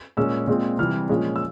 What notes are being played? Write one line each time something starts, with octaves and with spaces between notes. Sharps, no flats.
A#2 G#3 C#4 E6
A#2 G#3 C4
C3 E3 G3 F6
A#2 F3 G#3 C#4
E6